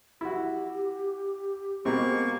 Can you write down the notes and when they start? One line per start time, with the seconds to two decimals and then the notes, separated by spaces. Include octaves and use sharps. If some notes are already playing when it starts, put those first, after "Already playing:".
0.21 E4 F#4 G4
1.85 B2 G#3 A#3 C4 C#6